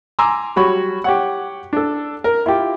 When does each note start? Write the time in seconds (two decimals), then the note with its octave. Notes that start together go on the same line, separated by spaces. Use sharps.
0.19 G#5 A#5 C6 D6 E6
0.56 F#3 G3 F#4 C#5 B5
1.04 G4 C#5 F#5
1.73 D4 A4
2.24 A#4
2.46 E4 F4 G4